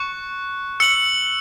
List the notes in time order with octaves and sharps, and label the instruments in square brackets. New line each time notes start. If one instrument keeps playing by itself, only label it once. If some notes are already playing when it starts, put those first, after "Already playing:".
Already playing: [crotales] C#6 F#6 C#7
E6 C#7 F#7